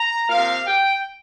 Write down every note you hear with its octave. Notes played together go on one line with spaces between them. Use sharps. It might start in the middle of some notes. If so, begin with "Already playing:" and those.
Already playing: A#5
C3 F3 A#3 F5
G5